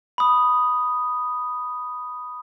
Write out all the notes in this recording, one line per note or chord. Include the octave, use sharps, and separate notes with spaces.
B5 D#6